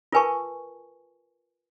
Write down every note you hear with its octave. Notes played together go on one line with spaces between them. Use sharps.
F4 A#4 B4 G#5 A5 C#6